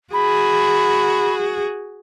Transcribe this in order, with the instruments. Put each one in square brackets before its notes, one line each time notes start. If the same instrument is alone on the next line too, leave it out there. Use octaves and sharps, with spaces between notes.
[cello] F#4 G#4 [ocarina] B5